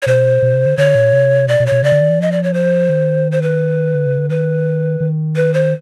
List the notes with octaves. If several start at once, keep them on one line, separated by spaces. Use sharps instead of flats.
C#5
B2 C5
B2
C3
D3
D3 C#5
A#2
C3
B2 D5
B2
C#5
B2
C#3 D5
D3
D#3
E3
F3 D#5
D5
C#5
C5
D#3
C5
B4
D3
C#3
D3
D#3 B4
D#3
B4
C5